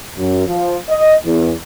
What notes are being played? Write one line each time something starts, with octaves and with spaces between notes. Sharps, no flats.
F#2
F3
D#5
E2